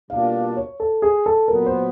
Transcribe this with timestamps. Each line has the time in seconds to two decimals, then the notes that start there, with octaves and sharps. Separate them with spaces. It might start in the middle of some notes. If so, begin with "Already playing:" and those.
0.09 B2 G3 A#3 D4 F4 F5
0.57 C#5
0.80 A4
1.02 G#4
1.26 A4
1.48 A#2 F#3 B3 A#4
1.66 C5